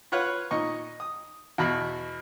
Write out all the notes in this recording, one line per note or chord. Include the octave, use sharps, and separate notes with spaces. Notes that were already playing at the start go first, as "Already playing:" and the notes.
F4 B4 C#5 F#5
A#2 D#4 D#5 C#6
D#6
E2 B2 F#4 B5